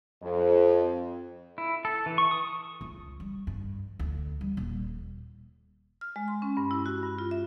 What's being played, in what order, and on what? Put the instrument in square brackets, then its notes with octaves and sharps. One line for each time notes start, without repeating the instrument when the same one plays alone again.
[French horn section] F2
[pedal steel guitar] E4
A4
E3
C#6
D#6
[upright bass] C#2
G3
G2
D2
G3
D#1
[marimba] F6
G#3
C6
C#4
G2
E4
F#4
G2
F4
E5